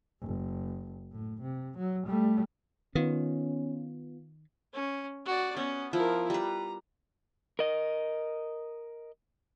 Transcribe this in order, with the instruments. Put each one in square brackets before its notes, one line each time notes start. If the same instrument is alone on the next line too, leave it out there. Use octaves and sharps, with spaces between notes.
[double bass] F#1
A2
C3
F#3
G3 A3
[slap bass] D#3 [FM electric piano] B3 F4 [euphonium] C#4
[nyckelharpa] C#4
F#4 D5
[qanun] B3 [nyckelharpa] C#4
[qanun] F3 [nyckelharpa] E4 A#4
[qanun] G3 B4 [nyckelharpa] A#5
[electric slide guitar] A#4 D#5